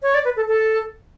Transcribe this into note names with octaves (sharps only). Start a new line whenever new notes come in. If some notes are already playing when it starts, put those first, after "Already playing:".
C#5
D5
B4
A4
A4